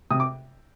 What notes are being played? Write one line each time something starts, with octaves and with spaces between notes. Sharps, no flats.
C3 D#6
D6